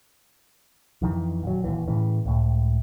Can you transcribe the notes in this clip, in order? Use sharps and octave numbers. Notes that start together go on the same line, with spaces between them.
F2 D#3 E3
D#1 F#3
D#1 D#2 E3
A2 C#3 E3
C#2 A2